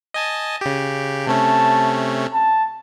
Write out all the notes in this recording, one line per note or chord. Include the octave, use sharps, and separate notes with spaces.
D#5 G#5 A5
C#3 G4
C3 A3 C#4 A5
A5